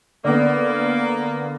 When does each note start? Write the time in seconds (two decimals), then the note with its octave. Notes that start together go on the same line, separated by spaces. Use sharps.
0.25 D3 A#3 B3 D5